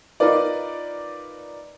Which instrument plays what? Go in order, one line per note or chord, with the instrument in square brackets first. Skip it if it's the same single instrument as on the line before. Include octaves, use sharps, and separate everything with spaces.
[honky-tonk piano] D#4 F4 A#4 B4 D5